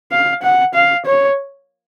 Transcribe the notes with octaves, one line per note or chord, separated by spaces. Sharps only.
F5
F#5
F5
C#5